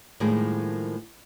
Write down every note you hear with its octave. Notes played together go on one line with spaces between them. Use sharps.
A2 D#3 F3 G3 G#3 A#3